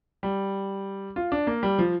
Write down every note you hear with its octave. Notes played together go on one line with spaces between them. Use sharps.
G3
F4
D4
A#3
G3
F3